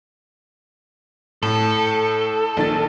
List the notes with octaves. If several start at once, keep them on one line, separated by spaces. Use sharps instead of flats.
A2 A4
A#1 D#3 A6